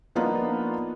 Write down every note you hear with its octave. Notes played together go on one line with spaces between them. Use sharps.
F3 A#3 B3 D4 D#4 F4